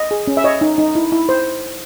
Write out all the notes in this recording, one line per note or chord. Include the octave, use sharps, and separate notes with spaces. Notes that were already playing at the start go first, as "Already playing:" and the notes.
Already playing: D#5
G#4
C#4
E5
C#5 D#5
D#4
D#4
E4
E4
C5